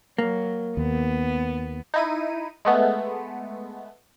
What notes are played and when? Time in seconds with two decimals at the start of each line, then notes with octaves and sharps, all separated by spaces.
0.18 F#3 A#3
0.77 D#2 B3
1.94 D#4 E4 D#7
2.65 G#3 A3 B3